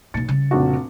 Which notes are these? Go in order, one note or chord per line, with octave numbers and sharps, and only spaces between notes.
B1 A#2 A6 C#7
C#3 G3
F1 A#1 F#4